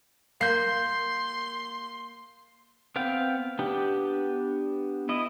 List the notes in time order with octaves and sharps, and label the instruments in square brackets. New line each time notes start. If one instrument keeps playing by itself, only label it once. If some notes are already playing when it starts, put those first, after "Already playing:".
[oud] A#3 [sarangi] C6 [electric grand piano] G6 C7
[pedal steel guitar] B3 C4 F5 G5
B3 D4 G4
E4 D#5